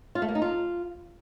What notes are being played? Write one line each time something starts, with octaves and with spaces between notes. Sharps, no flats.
F4
A3
A#3
D#4
F4